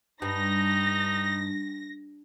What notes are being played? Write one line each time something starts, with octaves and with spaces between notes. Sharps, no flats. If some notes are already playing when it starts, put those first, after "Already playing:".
G2 D#4 A#6